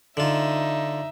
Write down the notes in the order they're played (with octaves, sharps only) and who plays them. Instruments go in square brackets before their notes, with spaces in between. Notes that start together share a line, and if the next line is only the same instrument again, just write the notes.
[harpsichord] D3 F4 [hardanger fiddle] D#4 E5